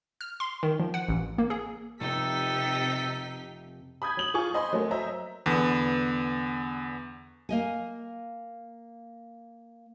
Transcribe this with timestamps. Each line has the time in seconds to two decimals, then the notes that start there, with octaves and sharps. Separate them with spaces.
0.21 F6
0.40 C6
0.63 D#3
0.80 F3
0.94 F#5
1.09 A1
1.38 A#3
1.50 G#4
2.00 F1 C3 D#4 A4 G5 B6
4.02 B5 D#6 G6 G#6
4.17 F#3 F#7
4.34 F4 G#4 G#5 C#6
4.54 C5 D#5 G#5 B5 C6
4.73 F#3 A3 A#3
4.91 C5 D#5 E5 A#5
5.46 E2 D3 B3
7.49 A#3 D#5 G#5